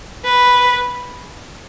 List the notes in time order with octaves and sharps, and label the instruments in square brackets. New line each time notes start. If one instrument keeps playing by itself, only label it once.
[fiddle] B4